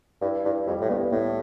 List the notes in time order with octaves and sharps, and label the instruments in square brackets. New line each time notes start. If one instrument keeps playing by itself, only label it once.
[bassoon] G2 [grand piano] E4
[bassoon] G2 [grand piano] E4
[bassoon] F2 [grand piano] G3
[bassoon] A2
[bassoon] G2 [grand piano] B3
[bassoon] A2 [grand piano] B3